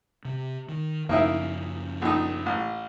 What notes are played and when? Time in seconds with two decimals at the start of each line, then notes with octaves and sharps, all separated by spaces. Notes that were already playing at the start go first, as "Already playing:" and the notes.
0.25 C3
0.69 D#3
1.09 F#2 C#3 F3 A#3 D#4 E4
2.02 A#1 D#4
2.46 A1